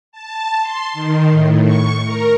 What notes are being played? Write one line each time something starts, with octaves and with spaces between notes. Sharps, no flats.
A5
C6
D#3
A2
C#6
A#4